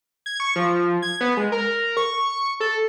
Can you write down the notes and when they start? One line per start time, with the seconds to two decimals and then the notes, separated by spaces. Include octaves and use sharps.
0.26 G#6
0.40 C#6
0.56 F3
1.02 G#6
1.21 B3
1.37 G#3
1.52 A#4
1.97 C#6
2.60 A4